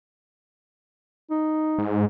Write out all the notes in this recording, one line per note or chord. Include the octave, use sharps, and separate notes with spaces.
D#4
G#2